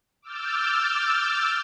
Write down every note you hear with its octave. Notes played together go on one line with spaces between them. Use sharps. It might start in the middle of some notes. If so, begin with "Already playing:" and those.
D6 E6 F6 G6 A6